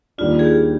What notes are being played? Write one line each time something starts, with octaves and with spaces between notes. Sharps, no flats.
D#2 D#3 G3 D4 F4
G#4
G4